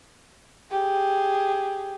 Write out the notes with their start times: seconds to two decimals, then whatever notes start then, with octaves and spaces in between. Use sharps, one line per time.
0.71 G4 G#4